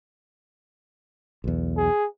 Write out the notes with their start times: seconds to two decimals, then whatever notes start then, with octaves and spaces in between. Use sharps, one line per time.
1.44 B1 E2
1.77 G#4